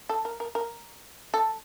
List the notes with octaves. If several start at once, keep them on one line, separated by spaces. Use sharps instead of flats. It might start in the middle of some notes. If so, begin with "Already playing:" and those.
A4
A#4
A#4
A#4
A4